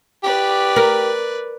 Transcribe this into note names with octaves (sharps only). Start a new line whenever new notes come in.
G4 B4 D5
A#4